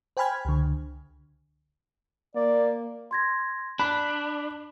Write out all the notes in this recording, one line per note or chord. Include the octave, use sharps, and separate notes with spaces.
C5 G5 G#5 B5 F6 G#6
C#2 D3
A#3 D5
C6 G#6 A#6
D4 B5 F#6